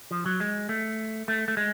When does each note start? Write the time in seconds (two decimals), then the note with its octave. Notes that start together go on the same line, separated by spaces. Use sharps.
0.11 F3
0.26 F#3
0.40 G#3
0.69 A3
1.28 A3
1.48 A3
1.57 G#3